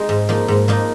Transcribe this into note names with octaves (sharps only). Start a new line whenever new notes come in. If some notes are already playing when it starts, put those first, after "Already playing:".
Already playing: G#3 D#4
G#2
F3 A#3 D#4
G#2
F3 A#3 D#4